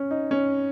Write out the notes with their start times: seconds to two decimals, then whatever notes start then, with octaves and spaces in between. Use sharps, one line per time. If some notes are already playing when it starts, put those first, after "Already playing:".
Already playing: C#4
0.11 D#4
0.31 C#4